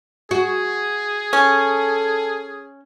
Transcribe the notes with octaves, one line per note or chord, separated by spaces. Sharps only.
F#4 G#4
C#4 A4